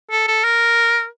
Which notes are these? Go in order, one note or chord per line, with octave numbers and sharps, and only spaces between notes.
A4
A4
A#4